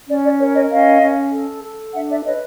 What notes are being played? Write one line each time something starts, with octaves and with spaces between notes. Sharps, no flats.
C#4 D5
D5
A#4 C#5
C#5 D#5
C#4 D#5 F5
C#4
A4
A4
D4 E5 F#5
D5 E5
B4 C#5 D#5